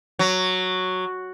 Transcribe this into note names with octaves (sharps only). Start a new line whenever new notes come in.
F#3